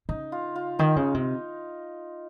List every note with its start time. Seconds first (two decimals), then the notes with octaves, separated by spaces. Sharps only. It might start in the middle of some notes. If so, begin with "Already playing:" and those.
0.09 C#3 D#4
0.32 F4
0.56 F4
0.79 D#3 D#4
0.96 C#3
1.14 C3